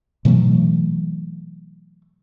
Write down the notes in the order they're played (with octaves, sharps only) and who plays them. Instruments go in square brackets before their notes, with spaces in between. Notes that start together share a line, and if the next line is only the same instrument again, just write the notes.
[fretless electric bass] B2 E3 F#3 A3